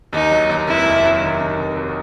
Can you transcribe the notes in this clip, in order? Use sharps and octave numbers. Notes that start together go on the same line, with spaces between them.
D#2 D#4
F#3
D#2
F1 E4
F1
F#3
D#3
D#3
F1
F#3